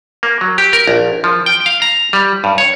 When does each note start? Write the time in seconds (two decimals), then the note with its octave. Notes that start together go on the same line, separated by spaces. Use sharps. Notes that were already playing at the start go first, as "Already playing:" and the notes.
0.23 A#3
0.41 F#3
0.58 G4
0.73 A#4
0.87 A#1
1.24 F3
1.46 G5
1.66 F5
1.82 A#5
2.13 G3
2.44 G2
2.58 C#5